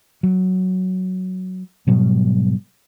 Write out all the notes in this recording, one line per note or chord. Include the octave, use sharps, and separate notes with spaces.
F#3
G#2 B2 F#3 G3